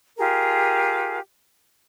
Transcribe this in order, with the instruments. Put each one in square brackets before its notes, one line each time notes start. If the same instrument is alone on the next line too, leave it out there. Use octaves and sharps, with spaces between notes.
[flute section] F4 G4 G#4 A#4